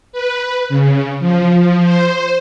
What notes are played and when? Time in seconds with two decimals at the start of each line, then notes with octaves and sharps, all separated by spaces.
0.12 B4
0.69 C#3
1.20 F3
1.83 C5